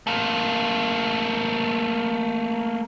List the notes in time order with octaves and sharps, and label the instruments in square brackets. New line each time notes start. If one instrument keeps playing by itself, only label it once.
[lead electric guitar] A3 A#3